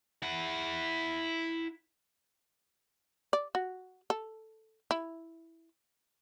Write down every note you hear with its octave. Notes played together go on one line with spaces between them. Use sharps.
E4 F#5
D5
F#4
A4
E4